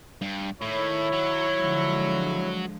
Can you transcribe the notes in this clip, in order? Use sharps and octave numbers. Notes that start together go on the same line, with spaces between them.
G2
A2 D#3 E4 C#5
F#3
D3 F3 G#3